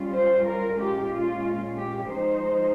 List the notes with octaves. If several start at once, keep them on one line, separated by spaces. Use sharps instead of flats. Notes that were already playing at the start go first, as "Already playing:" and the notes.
Already playing: G3 C#4 F4
C5
A#4
A#2 G#3 C#4 F4 G4
F4
G4
F3 G#3 D#4 C5